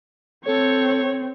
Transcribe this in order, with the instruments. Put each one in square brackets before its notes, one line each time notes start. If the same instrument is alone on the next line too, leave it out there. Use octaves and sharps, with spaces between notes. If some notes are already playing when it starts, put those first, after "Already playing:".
[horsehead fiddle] C4 [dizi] A4 [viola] C#5